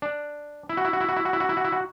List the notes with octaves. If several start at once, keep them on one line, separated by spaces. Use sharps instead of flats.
D4
E4
F#4
E4
F#4
E4
F#4
E4
F#4
E4
F#4
E4
F#4
E4
F#4